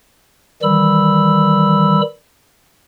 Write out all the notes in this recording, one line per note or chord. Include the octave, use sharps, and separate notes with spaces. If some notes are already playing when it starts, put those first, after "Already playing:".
D#3 E3 G3 B5 E6